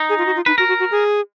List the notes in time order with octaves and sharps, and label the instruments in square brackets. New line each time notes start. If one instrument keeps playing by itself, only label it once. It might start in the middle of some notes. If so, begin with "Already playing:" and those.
Already playing: [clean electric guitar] D#4
[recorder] G#4
F4
F#4
F4
[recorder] D#4 [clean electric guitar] B4
[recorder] F#4 [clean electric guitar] A#4
[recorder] F#4
F#4
G#4